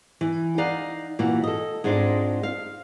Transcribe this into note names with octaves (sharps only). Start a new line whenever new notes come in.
E3
D#4 D5 F5 F#5
A#2 E3 F#4
A4 D#5
G#2 G#3 C4 D4 F4
F5